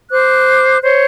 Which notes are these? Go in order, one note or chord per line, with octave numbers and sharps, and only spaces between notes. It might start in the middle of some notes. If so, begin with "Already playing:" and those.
C5 D6 F#6
C5 C#5